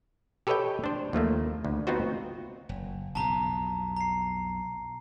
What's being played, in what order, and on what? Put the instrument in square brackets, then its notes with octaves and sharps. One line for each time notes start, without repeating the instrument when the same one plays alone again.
[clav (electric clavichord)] G4 A4 B4 C#5 D#5 G5
D4 C5
D#2 F3 A3 A#3
D2
B3 C4 D#4 F4 F#4 C5
[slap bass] F#1
[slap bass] B1 F2 B2 [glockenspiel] A5 A#5
[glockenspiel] A#5 C7